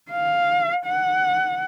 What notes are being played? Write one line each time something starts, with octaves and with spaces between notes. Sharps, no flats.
F5
F#5